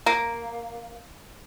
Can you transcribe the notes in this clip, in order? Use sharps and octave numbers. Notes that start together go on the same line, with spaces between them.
A#3